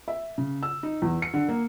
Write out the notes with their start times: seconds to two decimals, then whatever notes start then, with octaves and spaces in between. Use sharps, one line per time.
0.08 E5
0.38 C#3
0.63 E6
0.83 D#4
1.02 E2
1.22 C#7
1.34 D3
1.49 A#3